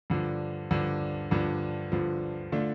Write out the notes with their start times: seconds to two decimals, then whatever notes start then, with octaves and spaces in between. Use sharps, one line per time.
0.10 G2 D3 F3
0.71 G2 D3 F3
1.31 G2 D3 F3
1.92 G2 D3 F3
2.52 D3 A3 D4 F4